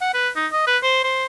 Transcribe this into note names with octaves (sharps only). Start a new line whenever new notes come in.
F#5
B4
D#4
D#5
B4
C5
C5